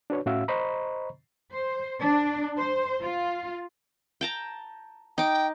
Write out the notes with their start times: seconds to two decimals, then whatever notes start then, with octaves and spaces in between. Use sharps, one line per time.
0.10 D4 F#4 B4 C#5
0.26 A2 C#4 F#4 E5 F5 E6
0.48 C5 D#5 A#5 B5 C#6
1.52 C5
2.00 D4
2.57 C5
3.02 F4
4.21 G5 A5 A#5
5.18 D#4 G5 D6